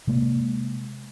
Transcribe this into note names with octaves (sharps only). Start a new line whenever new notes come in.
C3 G#3 A#3